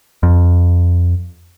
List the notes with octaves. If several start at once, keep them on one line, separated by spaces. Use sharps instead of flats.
F2